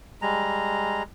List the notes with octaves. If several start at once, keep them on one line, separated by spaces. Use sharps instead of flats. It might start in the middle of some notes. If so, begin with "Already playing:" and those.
G3 G#3 A#5